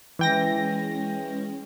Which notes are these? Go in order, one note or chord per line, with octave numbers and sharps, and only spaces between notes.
E3 G#3 C#4 G5 A#6